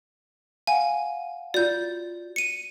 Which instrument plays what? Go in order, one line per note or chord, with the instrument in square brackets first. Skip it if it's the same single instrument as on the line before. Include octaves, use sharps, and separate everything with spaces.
[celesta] F5 F#5 [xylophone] G#5
[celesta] F4 F#4 [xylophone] D5 G6
[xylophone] C#7 D#7